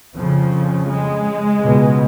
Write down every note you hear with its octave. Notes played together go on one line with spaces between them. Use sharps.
F2 C#3 F3
G#3
C#2 B2